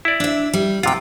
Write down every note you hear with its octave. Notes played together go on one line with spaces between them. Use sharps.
E4 D5
D4 E5
G3
C3 F4 F#5 G5